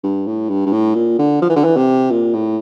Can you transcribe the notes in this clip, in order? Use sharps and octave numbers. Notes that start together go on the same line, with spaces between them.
G2
A2
G2
G2
A2
A#2
D3
F3
E3
D3
E3
C3
A#2
A2